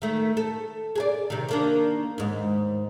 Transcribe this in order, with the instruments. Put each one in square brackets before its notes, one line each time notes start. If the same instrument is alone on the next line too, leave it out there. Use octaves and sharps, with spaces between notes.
[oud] D#3 A3
A4
G#4 A4 D5
C3 D#3
D#3 A#3 D4
D#2 G#2